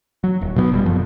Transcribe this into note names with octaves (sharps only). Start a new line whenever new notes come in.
F#3
D#1
B2 F#3 A3 B3
F1 A2 G3
F#2 F3